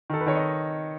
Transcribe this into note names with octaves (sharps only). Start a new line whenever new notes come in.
D#3 A4
B4
D#3 C#5
D#5